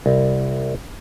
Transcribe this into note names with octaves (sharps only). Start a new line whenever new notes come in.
C2